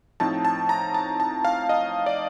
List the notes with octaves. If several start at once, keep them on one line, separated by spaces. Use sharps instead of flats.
A2 F3 C4 D#4 A5
A5
A#5
A5
A5
F5
D#5
D5